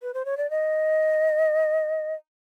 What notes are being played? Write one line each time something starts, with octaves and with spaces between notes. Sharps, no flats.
B4
C5
C#5
D5
D#5